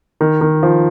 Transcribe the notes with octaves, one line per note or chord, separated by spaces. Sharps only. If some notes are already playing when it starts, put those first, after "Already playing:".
D#3
D#3
F3